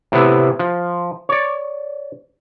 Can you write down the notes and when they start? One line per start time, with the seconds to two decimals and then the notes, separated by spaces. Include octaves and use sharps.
0.12 A2 C3 B3 E4
0.59 F3
1.29 C#5 D5